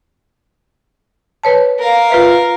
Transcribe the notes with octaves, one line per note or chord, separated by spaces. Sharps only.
B4 C#5 A5
A#4 F5
F4 B4 E5